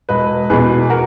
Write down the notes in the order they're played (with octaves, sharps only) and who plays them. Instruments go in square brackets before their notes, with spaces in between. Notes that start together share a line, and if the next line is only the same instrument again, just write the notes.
[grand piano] E1 B4 D#5
E2 B2 G#4 B4
F#4 A#4